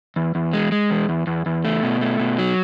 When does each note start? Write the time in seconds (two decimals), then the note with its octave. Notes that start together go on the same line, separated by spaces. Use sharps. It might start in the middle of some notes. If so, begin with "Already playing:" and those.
0.16 E2
0.35 E2
0.53 G#3
0.72 G#3
0.90 E2
1.09 E2
1.27 E2
1.46 E2
1.65 A3
1.83 B2
2.01 A3
2.20 B2
2.39 F#3